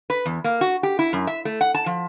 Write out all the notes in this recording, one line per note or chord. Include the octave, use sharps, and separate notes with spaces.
B4
E2
A#3
F#4
G4
E4
F#2
E5
A3
F#5
A5
F3